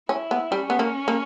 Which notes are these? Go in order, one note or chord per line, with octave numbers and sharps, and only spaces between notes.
C#4 E4
B3
G3 C#4
B3
A#3
A#3